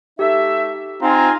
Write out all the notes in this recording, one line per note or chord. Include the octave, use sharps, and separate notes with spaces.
A3 D#4 G4 E5
C4 D#4 F4 G#5 A#5